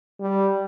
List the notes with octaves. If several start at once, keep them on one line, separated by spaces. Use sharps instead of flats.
G3